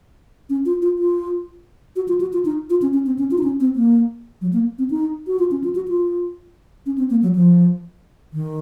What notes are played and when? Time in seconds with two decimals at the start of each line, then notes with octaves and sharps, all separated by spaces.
0.49 C#4
0.66 F4
0.82 F4
0.99 F4
1.96 F#4
2.08 F4
2.21 F#4
2.33 F4
2.45 D#4
2.70 F4
2.82 C#4
2.94 C#4
3.06 C4
3.19 C#4
3.31 F4
3.38 D#4
3.43 C#4
3.60 C4
3.76 A#3
4.41 F#3
4.53 A#3
4.78 C4
4.90 D#4
5.27 F#4
5.39 F4
5.51 C#4
5.64 F4
5.75 F#4
5.88 F4
6.86 C#4
6.98 C4
7.10 A#3
7.22 F#3
7.35 F3
8.33 D#3